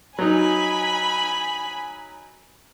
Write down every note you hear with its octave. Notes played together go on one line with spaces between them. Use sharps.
F#3 D#4 G#5 B5